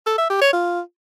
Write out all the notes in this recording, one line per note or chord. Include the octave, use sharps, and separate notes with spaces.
A4
E5
G4
C#5
F4